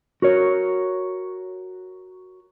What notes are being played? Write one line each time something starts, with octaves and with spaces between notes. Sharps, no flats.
F#4 A#4 C#5